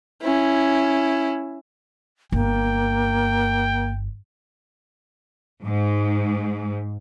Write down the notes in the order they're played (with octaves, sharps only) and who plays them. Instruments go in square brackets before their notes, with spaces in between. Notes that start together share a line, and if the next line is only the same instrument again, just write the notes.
[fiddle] C#4 E4
[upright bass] G1 [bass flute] A#3 [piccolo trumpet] G5
[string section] G#2